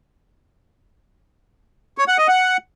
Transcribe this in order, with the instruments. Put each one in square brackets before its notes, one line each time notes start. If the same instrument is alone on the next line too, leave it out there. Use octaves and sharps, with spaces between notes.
[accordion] C#5
F#5
D#5
F#5